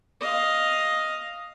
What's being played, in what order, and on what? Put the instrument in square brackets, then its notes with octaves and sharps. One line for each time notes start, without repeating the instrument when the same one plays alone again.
[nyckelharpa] D#5 F5